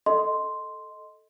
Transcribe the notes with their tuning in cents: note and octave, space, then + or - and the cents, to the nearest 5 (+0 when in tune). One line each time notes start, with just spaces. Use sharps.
A4 +0 D#5 +0 C6 +0